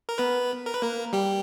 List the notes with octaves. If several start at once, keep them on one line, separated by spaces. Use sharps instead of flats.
A#4
B3 B4
A#4
B4
A#3 A#4
G3 G4